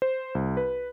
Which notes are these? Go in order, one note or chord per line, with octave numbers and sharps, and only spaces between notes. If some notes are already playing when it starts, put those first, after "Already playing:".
C5
C2
B4